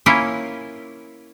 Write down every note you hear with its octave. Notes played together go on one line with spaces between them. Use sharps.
A#3 C#4 E4 F4